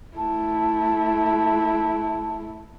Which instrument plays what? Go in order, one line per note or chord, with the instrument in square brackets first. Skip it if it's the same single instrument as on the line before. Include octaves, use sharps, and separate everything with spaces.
[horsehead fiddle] A3 E4 [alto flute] A5